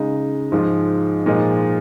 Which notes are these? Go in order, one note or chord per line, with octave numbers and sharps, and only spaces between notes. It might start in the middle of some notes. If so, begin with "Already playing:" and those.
Already playing: C#3 G#3 D#4
G#2 F3 G#3
A#2 F3 G#3 D#4